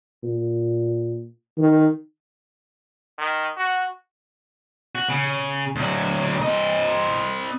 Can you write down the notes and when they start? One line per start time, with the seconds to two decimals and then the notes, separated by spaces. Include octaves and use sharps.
0.23 A#2
1.58 D#3
3.18 D#3
3.57 F#4
4.95 F#4
5.09 C#3
5.76 D2 F#3
6.42 C4 D#5